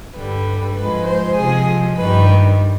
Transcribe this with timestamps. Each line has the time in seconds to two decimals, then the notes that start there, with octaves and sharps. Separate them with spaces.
0.14 G2 D3 G3 B4
0.75 G#2 F3 G#3 B4
1.05 C5
1.36 C3 F3 G#3 G#4
1.97 G2 D#3 G3 B4